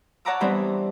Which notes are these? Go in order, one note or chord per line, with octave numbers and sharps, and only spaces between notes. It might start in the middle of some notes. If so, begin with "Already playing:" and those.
C#5 F#5 A5 A#5 D6 E6
E3 G3 B3 C4 D4